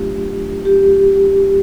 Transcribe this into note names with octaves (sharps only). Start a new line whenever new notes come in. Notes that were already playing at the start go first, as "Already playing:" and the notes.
Already playing: F#3 A3 D4 F4 G4
G4